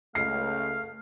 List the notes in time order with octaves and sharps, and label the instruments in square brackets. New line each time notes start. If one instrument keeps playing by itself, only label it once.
[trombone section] C#2 [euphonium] A3 [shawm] F5 [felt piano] C7